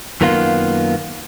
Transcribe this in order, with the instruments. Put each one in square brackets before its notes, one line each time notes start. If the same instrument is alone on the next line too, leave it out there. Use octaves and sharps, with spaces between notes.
[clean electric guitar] F#2 D#3 A#3 B3 F4